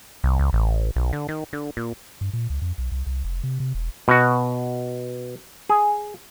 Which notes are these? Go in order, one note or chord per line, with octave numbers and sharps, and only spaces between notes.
C2
C#2
A1
B1
D3
D#3
D3
A#2
G2
A#2
C#2
F2
B1
C2
C2
F1
C3
C3
E1
B2 F#4
G#4